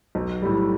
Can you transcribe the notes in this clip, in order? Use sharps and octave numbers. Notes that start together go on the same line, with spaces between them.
B1
A2 G3